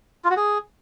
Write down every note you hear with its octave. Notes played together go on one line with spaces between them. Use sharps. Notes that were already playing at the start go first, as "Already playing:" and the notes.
F4
F#4
G#4